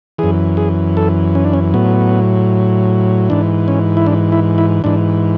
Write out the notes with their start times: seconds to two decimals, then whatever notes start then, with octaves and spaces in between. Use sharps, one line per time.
0.18 F#2 E3 G#4
0.57 G#4
0.97 A4
1.35 C#4
1.45 D4
1.54 C#4
1.74 A2 F#3 B3
3.30 G#2 E3 D4
3.68 C#4
3.97 E4
4.06 D4
4.32 E4
4.58 E4
4.84 G#2 E3 D4